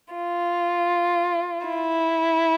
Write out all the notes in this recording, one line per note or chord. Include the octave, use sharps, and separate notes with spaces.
F4
E4